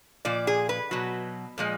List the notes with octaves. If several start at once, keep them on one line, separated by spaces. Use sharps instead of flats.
A#2 F3 D5
G#4
B4
B2 F#3
A#2 F3 G#3